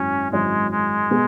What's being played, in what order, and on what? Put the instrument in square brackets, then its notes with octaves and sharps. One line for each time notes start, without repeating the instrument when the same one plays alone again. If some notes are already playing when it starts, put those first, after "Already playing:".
Already playing: [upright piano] G#1 F#2 F#3 E4 [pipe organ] C#4
[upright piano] G#1 F#2 F#3 E4 C#5 [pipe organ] G#3
[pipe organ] G#3
[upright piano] B2 B3 G#4